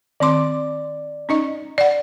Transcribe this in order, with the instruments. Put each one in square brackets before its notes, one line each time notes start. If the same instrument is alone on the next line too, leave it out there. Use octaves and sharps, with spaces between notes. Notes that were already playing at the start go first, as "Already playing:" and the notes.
[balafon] D#3 C4 C6 [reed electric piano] D5 D6
[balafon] C#4 D#4 D#5
D5 F#5